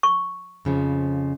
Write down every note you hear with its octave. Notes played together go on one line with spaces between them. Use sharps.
C#6
F2 C#3 F3